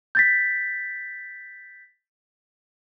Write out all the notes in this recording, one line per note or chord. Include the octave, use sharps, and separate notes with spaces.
G6 A6 B6